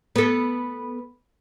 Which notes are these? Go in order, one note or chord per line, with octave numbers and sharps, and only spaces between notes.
B3 A4